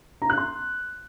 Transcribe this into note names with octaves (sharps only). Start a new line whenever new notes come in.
A#5
F#6
C6